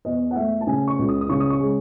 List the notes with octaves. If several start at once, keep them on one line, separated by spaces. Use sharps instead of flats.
E2 D#5
F#5
A3 E5
A5
C#3 G#5
C#6
C#2
D#6
D#6
C#3 C#6
D#6
C#6
G#3